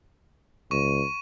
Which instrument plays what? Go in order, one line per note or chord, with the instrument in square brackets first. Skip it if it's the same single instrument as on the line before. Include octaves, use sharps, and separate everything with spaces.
[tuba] C#2 [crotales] C#6 D#7